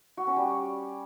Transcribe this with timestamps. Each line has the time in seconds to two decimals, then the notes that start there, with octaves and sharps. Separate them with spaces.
0.17 F#4
0.27 C#4
0.36 G3